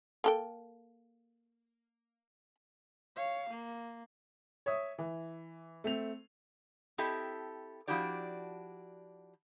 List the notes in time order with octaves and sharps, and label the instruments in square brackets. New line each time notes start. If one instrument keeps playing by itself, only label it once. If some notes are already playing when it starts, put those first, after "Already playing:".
[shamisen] A#3 A4 G5
[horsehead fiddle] C#5 F5
A#3
[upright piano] C#5 E5 D#6
E3
A3 C4 F7
[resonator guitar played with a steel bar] C4 E4 G4 A4 D#5 E5
F3 D4 E4 F#4 G4 D5